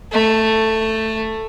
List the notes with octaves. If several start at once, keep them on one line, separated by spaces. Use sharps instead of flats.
A3